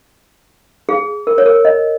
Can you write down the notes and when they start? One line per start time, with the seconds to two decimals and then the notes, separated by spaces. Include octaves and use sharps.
0.89 G#4
1.27 A#4
1.38 C#5
1.46 A#4
1.65 D#5